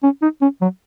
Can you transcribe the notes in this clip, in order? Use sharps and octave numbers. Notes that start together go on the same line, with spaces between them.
C#4
D#4
C#4
F#3